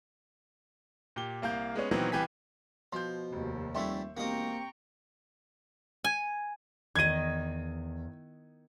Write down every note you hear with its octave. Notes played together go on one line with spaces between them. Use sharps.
A#2 G4 G7
C2 A#3 F5 G6
G#3 B3 C#4
A#2 D#3 E3 F#3 B3 C4
C2 E3 G4 B4 G#5 B6
B2 F3 C6 G6
F1 D#2
F1 G3 A3 E4 E5 C6 C#6
E1 A#3 C4 G4 D#5 G5 A#5 C#6
G#5
E2 D#3 D#5 G#6 D#7